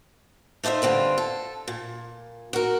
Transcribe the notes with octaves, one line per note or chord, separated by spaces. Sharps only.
A3 D#4 F4 C5 E5
G2 D3 C4 F4
A4
A#2
F#4 A#4